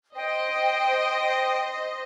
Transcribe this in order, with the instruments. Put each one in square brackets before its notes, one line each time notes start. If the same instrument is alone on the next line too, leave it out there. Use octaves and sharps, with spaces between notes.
[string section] C5 D#5 [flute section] G5